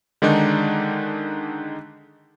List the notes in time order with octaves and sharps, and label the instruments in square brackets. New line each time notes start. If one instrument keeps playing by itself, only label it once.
[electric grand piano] D3 D#3 G#3 D4 D#4